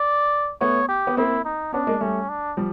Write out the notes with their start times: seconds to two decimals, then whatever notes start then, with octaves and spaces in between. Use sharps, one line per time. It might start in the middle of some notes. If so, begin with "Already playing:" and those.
Already playing: D5
0.61 A3 B3 C#5
0.89 G4
1.07 B3
1.17 A#3 C4 E4
1.45 D#4
1.73 B3 C#4 D4
1.87 G#3 A#3
2.01 G3 A3 C#4
2.29 D4
2.57 F3 G3